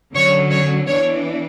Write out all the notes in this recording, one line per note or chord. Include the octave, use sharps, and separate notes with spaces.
D3 F#3 C#4 C#5
C#5
E3 B3 D4 C#5